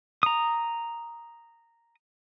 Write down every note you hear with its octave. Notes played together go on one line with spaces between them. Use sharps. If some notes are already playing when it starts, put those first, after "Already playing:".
A#5 D#6